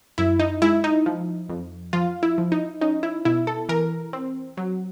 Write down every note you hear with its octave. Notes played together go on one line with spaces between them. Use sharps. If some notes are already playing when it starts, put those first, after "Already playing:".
F#2 E4
D#4
G#3 E4
D#4
F3
F2
F3 F4
E4
F3
D#4
C#4 D#4
E4
B2 E4
A4
E3 A#4
C4
F#3